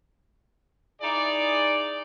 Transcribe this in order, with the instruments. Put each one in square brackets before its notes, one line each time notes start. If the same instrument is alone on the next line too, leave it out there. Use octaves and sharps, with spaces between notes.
[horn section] D#4 E4 G#4 D5